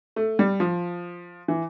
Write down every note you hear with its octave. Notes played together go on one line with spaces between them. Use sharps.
A3
G3
F3
E3